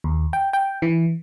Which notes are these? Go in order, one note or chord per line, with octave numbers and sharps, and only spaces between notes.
D#2
G5
G5
E3